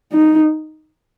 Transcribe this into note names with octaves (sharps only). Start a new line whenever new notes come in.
D#4